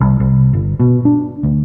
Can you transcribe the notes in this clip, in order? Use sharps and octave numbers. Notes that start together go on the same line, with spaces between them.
C2
C2
G1
B2
D4
D2